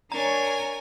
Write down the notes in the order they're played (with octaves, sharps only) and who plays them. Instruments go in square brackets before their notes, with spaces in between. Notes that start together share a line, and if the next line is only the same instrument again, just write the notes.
[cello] D4 C#5 [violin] A#4 G#5 [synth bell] A#5